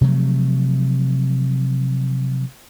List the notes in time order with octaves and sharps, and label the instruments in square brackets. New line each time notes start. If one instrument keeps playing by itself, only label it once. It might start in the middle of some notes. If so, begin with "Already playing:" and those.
[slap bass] C3 F3 F#3 A3